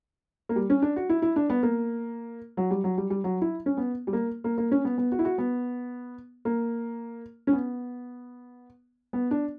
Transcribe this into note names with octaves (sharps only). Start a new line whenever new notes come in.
A#3
G3
C#4
D4
F#4
E4
E4
D4
B3
A#3
F#3
G3
F#3
G3
G3
F#3
E4
C#4
B3
G3
A#3
A#3
A#3
C#4
B3
B3
F#4
E4
F#4
B3
A#3
C#4
B3
B3
D4